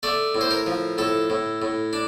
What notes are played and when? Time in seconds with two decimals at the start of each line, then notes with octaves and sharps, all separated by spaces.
0.03 A3 D5
0.35 A2
0.41 C5
0.51 A#4
0.67 F3
0.98 A2 A4
1.30 A2
1.62 A2
1.93 D4